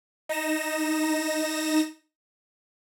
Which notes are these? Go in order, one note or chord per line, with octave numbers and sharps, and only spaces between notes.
D#4 A#6 E7